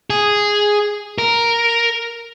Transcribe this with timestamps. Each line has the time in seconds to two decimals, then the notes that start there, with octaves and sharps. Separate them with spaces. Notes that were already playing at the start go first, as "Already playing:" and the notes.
0.10 G#4
1.18 A#4